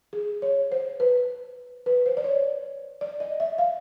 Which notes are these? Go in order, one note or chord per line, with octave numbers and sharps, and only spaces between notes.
G#4
C#5
C5
B4
B4
C5
D5
C#5
D5
D#5
E5
F5